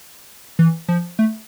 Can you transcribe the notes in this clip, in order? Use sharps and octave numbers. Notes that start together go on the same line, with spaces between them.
E3
F3
A3